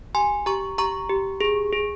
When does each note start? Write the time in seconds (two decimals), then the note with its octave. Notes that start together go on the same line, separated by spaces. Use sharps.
0.15 G4 G#5 C6
0.46 G4 A#5 C#6
0.78 G4 A#5 C#6
1.10 G4
1.41 G#4
1.73 G#4